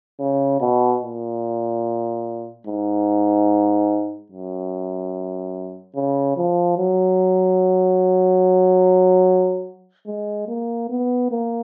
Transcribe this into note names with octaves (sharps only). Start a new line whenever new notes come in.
C#3
B2
A#2
G#2
F#2
C#3
F3
F#3
G#3
A#3
B3
A#3